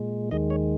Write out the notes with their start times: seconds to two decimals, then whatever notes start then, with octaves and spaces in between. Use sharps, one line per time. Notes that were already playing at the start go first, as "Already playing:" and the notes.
Already playing: A#2 G#3
0.31 D#2 D#3 G#3 D#5
0.50 C#5